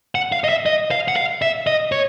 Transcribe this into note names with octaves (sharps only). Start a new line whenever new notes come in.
F#5
F5
D#5
E5
D#5
F5
F#5
F5
E5
D#5
C#5